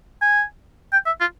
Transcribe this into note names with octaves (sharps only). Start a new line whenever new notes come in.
G#5
G5
E5
F4